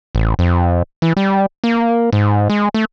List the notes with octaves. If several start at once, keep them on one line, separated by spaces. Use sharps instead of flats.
A1
F2
E3
G3
A#3
G#2
G#3
A3